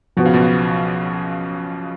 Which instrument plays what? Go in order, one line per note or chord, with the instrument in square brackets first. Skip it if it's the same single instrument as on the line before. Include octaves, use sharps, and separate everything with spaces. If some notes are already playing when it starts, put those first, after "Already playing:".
[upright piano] B2 [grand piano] F3 B3 F#4
[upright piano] C#3
B1 B2